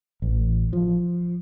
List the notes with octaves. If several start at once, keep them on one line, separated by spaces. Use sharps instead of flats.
A1
F3